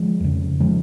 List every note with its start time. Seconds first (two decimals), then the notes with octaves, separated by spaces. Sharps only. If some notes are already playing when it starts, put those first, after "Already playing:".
Already playing: F3 G#3
0.20 F2 C#3
0.60 C#3 F3 G#3